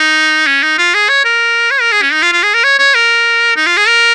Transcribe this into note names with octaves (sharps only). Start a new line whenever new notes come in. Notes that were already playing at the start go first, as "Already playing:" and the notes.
Already playing: D#4
C#4
D#4
F4
G#4
C#5
A#4
C#5
A#4
G#4
C#4
D#4
F4
F4
G#4
A#4
C#5
C#5
A#4
D#4
F4
G#4
A#4